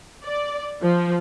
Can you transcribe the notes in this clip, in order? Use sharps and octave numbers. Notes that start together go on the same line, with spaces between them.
D5
F3